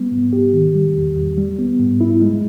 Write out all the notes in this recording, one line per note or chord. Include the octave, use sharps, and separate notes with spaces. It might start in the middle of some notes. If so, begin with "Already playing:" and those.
Already playing: G3 B3
G#2
G4
D#3
G3
E2
E2
G3
B3
G#2
E4
G#3